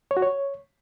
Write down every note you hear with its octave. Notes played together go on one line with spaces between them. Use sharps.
C#5
F#4
C#5